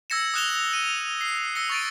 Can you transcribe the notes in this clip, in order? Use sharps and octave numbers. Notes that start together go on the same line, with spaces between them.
E6 G#6 A#6 C#7 E7
D#6 F6 F#6 E7 F7 G7
D#7
C7
E6 A#6 C#7 G7
C#6 A6 D7